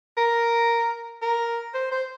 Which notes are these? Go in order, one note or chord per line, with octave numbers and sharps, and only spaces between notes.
A#4
A#4
C5
C5